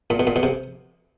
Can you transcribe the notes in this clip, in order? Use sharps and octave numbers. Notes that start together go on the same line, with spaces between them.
A#2
B2
A#2
B2
C3